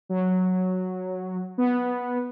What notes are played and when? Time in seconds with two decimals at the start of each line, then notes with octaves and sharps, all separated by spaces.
0.09 F#3
1.58 B3